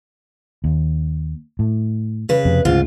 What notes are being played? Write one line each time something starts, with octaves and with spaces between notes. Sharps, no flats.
D#2
A2
C#3 B4
F2 C3
D2 G#2 C#3 F4